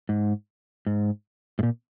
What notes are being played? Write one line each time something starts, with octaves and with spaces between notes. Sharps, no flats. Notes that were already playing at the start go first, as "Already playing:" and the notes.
G#2
G#2
G#2
A#2